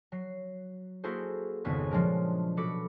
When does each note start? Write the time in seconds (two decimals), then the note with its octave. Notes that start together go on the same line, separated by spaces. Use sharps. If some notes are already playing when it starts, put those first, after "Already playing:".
0.12 F#3 C7
1.04 A#3 E4 F#4 G#4 A4 C5
1.64 G#1 F2 C#3 B3 C#6 G#6
1.91 A#2 F3 F#3 G#3 D4 A#4
2.57 B2 F#4 A4 B5 D6 C#7